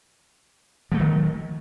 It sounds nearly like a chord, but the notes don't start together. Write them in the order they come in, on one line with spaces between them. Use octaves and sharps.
F3 A3 F#3 D#3